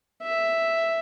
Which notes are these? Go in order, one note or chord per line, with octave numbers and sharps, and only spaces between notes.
E5